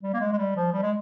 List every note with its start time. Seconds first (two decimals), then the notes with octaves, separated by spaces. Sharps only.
0.03 G3
0.13 A#3
0.20 G#3
0.33 G#3
0.38 G3
0.56 F3
0.73 G3
0.82 G#3